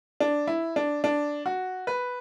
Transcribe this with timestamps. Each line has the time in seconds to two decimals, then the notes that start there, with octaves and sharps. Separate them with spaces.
0.20 D4
0.47 E4
0.76 D4
1.04 D4
1.46 F#4
1.87 B4